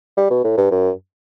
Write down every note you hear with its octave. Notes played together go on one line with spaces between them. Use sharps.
G3
B2
A2
G2
F#2